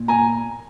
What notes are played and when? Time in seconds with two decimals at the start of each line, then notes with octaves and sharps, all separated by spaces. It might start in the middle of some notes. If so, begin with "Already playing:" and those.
Already playing: A#2
0.08 G#5 A#5